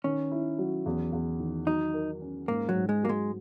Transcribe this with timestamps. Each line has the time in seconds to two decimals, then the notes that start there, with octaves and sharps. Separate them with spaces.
0.04 D#3 C#4
0.32 E4
0.58 F#3
0.86 E2
1.13 E2
1.40 D#3
1.67 F#3 D#4
1.94 A#4
2.21 C#4
2.48 G#2 A#3
2.69 F#3
2.75 G#2
2.89 G#3
3.03 F#3 A#3
3.09 G#3